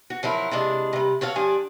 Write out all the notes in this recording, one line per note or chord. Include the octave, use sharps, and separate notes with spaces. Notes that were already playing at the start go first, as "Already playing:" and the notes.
F#4
F3 F#3 E4 A#4
C3 E3 G#3 D4
C3 G3
F#4 A4 C#5 F5
F3 D4 G4 G#5